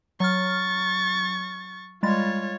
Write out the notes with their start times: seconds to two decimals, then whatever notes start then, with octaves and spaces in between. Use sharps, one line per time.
0.20 F#3 C#6 F6 A6
2.03 G3 G#3 F4 C#5 A6